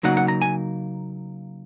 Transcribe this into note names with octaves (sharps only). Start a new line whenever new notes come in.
C#3 F#3 A#3 D#4 F#5
F#5
A#5
G#5